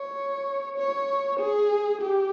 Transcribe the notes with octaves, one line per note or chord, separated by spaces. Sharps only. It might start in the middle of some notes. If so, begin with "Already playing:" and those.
Already playing: C#5
C#5
G#4
G4